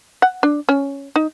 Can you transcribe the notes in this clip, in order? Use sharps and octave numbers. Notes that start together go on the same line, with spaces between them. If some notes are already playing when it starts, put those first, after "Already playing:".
F#5
D4
C#4
D#4